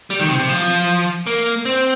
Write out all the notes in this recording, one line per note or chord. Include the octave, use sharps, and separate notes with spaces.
G3
D#3
C3
C3
F3
A#3
C4